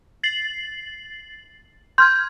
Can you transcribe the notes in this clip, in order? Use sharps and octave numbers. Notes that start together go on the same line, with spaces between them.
A6 C7 F#7
C6 F6 G6 G#6